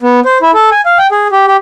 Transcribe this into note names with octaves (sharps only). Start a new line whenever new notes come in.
B3
C5
E4
A4
G#5
F5
G5
G#4
G4
G4